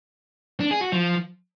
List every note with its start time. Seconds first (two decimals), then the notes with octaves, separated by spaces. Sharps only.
0.60 D4
0.71 G#4
0.82 F#4
0.92 F3